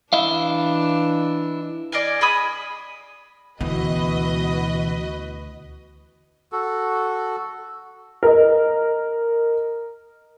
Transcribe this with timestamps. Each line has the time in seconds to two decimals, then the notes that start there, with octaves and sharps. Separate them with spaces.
0.13 E3 D4 E4 D#5 F5
1.92 D5 D#5 F5 G#5
2.21 G#4 B5 D#6
3.61 D2 B2 E3 F#4 B4 D#5
6.52 F#4 A4
8.23 A#4 D#5